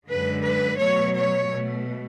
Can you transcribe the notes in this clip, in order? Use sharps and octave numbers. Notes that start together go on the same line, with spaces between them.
F#2 D3 G#3 B4
B4
B2 F#3 A3 C#5
C#5
B2 A3